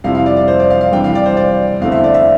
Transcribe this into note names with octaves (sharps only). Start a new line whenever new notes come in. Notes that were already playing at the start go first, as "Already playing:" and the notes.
F2 C3 G3 C4 E4 F5
F5
D5
D5
C5
D5
F5
F5
C3 E3 G3 D4 G5
F5
D5
C5
D5
E2 D3 A3 C4 E4 F5
E5
D5
E5